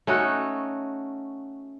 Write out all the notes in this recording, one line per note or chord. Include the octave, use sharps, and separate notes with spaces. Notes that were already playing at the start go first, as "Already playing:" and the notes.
A3 C#4 D#4 F#4